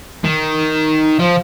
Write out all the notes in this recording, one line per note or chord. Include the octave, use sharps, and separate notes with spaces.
D#3
F3